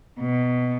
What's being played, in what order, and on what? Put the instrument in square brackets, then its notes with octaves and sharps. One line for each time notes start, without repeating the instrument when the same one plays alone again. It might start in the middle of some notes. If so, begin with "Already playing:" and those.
[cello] B2